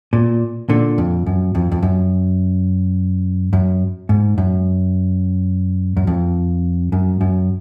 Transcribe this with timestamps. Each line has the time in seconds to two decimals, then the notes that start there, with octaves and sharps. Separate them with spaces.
0.13 A#2
0.69 A#2 D3
0.98 F2
1.26 F#2
1.55 F2
1.72 F2
1.83 F#2
3.53 F#2
4.09 G#2
4.38 F#2
5.97 F#2
6.07 F2
6.92 F#2
7.21 F#2